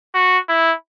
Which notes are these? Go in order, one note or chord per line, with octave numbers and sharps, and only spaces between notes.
F#4
E4